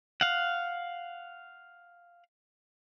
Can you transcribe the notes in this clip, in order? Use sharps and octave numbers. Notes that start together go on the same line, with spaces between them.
F5 F#5